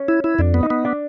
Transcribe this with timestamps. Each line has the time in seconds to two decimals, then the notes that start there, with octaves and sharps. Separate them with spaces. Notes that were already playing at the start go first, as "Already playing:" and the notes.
Already playing: C#4
0.08 E4
0.24 E4
0.39 F2 D4
0.54 B3
0.63 D#4
0.70 B3
0.85 D4